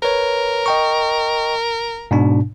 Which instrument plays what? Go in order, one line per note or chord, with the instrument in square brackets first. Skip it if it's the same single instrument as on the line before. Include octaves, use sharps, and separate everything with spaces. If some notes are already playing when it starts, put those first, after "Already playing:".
[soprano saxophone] A#4 [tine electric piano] B4 C#5
[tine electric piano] D#5 G5 C#6
G#2 B2 D4